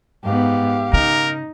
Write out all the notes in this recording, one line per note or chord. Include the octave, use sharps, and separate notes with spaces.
G#2 B3 G4 F5
C#3 D#4 A#4